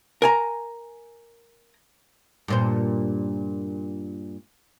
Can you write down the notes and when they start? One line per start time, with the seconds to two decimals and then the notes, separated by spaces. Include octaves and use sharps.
0.22 A#4 G#5 A#5
2.48 G2 A#2 C5